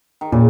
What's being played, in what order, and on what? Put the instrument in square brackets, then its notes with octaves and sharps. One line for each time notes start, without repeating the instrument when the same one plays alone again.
[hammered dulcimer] D#3
[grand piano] A#2 [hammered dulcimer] C#3